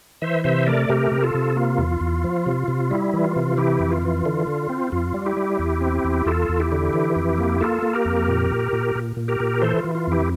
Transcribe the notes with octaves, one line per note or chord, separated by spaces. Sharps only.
E3 C5 E5
C3 C5 E5
A3 A#4 D5
C3 G4 A#4
C3
F4 A4
C3
A#3 F4
E2
E2
F3
C3
C3
G3 E4
E3
F4
C3
E3 E4 G4
F2
F4
E3
D3
D3
C4
F2 F4
G3
E4 G4
G3
E2
C4
E2
E2 F4 A4
E2
E4 G4
D3
E3
F2
A#3
A#3 F4 A4
A#3
G4 A#4
F2
A#2
A#2
A#2
A#2
A#2
G4 A#4
A#2
E3 A4 C5
F4
E3
F4
F2 E4 G4